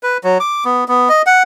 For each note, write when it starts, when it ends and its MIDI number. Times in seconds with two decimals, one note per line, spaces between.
0.03 0.18 71
0.24 0.38 54
0.40 0.64 86
0.65 0.84 59
0.88 1.09 59
1.09 1.22 75
1.26 1.43 78